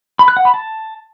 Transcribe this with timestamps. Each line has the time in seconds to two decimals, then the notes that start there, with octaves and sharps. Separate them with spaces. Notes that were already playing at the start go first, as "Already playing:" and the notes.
0.19 B5
0.28 F#6
0.37 F#5
0.45 B5
0.54 A5